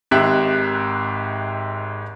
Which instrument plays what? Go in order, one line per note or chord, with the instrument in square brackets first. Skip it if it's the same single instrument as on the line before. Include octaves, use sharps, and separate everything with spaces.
[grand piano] G#1 G#2 G4 E5 F#6